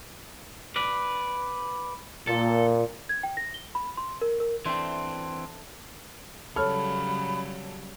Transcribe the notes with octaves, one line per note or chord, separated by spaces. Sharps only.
B4 D5
A#2 A4
G#6
G5
A#6
G7
B5
C6
A#4
A#4
E3 A3 C4 D4 E4 C6
C#3 F#3 G3 A4 C#5 B5 F6